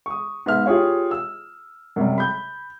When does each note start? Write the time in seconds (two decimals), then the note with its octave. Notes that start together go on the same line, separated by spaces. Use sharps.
0.06 C#6 D#6
0.46 G#2 B3 E5 F6
0.66 F4 G4 G#4 C#5 F5
1.11 E6
1.96 F#2 C3 G3
2.18 B5 G6